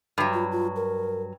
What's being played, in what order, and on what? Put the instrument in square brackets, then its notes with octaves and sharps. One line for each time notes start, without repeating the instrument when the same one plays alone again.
[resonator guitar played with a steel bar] G2 F#3
[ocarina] F4
F4
A#4